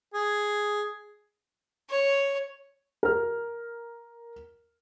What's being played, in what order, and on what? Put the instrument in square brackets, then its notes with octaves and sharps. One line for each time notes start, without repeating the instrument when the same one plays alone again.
[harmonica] G#4
[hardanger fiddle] C#5
[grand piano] A#4 F6